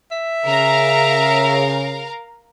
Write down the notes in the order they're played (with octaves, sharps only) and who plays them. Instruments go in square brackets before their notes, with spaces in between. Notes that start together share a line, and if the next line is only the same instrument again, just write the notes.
[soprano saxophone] E5
[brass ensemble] C#3 [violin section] A#4 F5 A#5